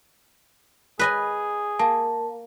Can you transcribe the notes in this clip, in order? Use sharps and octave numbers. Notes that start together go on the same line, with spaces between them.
G#4 B4 D#5 G#5
A#3 A5